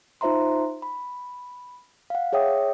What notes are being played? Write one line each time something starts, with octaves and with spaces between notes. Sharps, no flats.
D#4 F4 C5 E5 A#5 C6
B5
F5 F#5
G#4 C#5 E5 G5 D#6